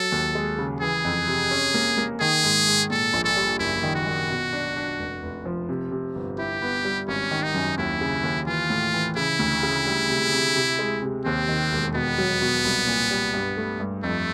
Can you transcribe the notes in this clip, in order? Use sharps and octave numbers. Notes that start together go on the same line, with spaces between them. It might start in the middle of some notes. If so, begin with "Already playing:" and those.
Already playing: F#3 A4
D#2
G#3
C#3
E3 G#4
F2
C3
C#4
A#3
A#3
D#3 G#4
G#2
G#2
A#2 A4
A#1
A4
G3
F#1 E4
D#3
F#4
D#3
B2
D4
D4
F1
F1
F3
C3
C3
G1
E4 G4
B3
G3
G#1 C#4
D#3
D#4
F#2
D#2 E4
C#3
D#2
E3 F4
A2
E3
C#3 E4
D2
C#3
G3
C3
C3
C3
G#3
C3
D#2 C4
D#3
E1
B2 B3
F#3
B2
C2
A#2
G3
G2
A3
G2
F2 A3